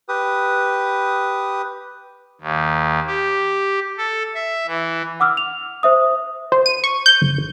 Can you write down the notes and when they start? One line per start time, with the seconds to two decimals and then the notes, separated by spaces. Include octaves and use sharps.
0.09 G4 B4 D#6
2.41 D#2
3.07 G4
3.98 A4
4.34 E5
4.67 E3
5.20 F#5 D6 E6 F6
5.37 F7
5.83 C5 E5 D#6
6.52 C5
6.66 D#7
6.84 C#6
7.06 G6
7.22 G1
7.37 G#1